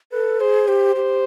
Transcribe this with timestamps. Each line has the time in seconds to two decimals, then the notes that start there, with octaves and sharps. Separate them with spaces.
0.12 A4 B4
0.40 G#4 C5
0.68 G4 C5
0.96 G4